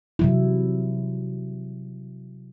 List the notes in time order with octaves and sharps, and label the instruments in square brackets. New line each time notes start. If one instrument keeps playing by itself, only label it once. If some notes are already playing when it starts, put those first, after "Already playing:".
[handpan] C3 F#3 E4